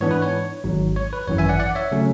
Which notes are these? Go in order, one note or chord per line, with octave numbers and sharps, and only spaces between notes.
G#2 E3 B3 D4 C#5
B4
C#5
G#1 G#2 F#3
C#5
B4
G#1 F#2 E3 C#5
E5 G#5
D5 F#5
D5 F#5
C#5 E5
C#3 F#3 A3 C#4